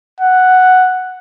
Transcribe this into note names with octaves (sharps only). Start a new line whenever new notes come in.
F#5